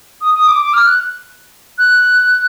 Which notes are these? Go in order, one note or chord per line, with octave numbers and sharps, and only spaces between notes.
D#6
D#6
D6
D6
F6
F#6
F#6